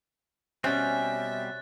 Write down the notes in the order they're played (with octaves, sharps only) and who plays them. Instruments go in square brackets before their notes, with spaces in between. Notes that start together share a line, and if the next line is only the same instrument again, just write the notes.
[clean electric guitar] B2 G3 C4 [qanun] C#4 [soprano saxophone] E5 [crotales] F#6 A6